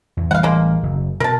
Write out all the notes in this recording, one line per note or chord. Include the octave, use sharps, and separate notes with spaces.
E2
A1 E3 G3 F5 F#5
G#3 A#3
F#1
B2 A#4 A5